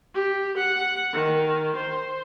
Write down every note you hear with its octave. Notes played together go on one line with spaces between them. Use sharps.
G4
F#5
D#3
C5